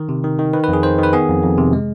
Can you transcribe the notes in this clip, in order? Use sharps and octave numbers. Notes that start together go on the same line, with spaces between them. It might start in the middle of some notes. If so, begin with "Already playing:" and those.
Already playing: D#3
C3
D#3
D#3
D#3 B4
B4
F2
G#4
D#3 C5
D#3 B4
B3 G#4
F2
F2
C3
G#3